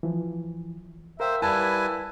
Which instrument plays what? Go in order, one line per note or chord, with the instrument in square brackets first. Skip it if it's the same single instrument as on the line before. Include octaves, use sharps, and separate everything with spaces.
[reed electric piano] E3 F3
[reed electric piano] A#4 F5 G5 [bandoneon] C5 [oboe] E5
[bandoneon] G3 B4 G#5 [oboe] E4 [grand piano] A5